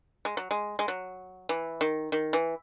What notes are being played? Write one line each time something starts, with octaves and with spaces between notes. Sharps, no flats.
G#3
F#3
G#3
G#3
F#3
E3
D#3
D#3
E3